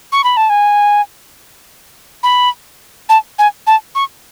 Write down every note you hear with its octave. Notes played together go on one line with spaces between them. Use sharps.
C#6
B5
A5
G#5
B5
A5
G#5
A5
C#6